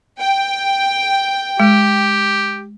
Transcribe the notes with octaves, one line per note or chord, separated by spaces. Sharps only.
G5
G#3 G4